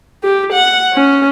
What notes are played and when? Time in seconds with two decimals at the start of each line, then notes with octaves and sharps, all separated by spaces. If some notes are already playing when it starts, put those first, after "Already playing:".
0.23 G4
0.53 F#5
0.93 C#4